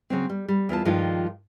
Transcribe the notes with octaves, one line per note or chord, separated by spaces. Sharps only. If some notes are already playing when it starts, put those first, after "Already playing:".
C#3 F#3 C4
G3
G3
E2 A#3 F4 A5
G2 D#3 F3 G#3 D#4 F4